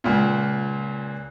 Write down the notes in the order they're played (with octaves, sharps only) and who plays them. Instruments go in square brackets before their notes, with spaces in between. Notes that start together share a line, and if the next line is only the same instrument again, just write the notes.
[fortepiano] C#2 A#2